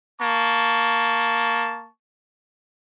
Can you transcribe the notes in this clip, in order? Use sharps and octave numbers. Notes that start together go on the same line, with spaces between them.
A#3 A5 C#6